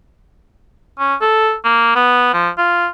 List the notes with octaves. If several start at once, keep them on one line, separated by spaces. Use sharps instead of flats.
C#4
A4
A#3
B3
F3
F4